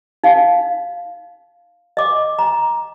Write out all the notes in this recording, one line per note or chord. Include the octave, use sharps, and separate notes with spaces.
D#4 F5
D#5 D6
A#5